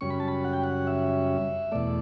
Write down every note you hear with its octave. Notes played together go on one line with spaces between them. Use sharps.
F#2 C#3 G3 C#4 C#6
B5
A5
B5
F#5
G5
F#5
E5
E2 B2 A3 D5